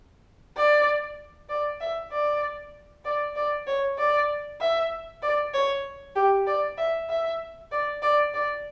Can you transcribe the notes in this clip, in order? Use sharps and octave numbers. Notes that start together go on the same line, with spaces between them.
D5
D5
E5
D5
D5
D5
C#5
D5
E5
D5
C#5
G4
D5
E5
E5
D5
D5
D5